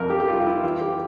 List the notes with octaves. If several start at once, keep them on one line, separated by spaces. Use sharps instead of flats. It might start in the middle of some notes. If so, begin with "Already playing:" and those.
Already playing: F2 A#4
G4
G4
G3 F4
F4
E4
E3 F4
G4